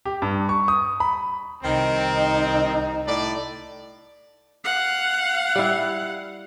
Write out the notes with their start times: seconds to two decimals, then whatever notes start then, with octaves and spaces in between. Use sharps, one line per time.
0.05 G4
0.22 G2
0.49 C#6
0.68 D#6
1.00 B5
1.63 C2 D#3 C4 D#4
3.07 A2 D5
4.64 F5 F#5
5.55 G3 E4